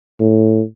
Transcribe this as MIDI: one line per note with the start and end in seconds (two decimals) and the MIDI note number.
0.20 0.61 45